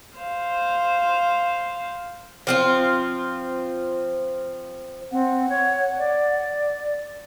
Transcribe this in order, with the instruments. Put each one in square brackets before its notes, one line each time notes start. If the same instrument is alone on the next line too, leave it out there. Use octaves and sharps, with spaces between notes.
[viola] C5 F5
[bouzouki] F3 C4 F4
[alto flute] C4 [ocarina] F#5
[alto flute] C#5
D5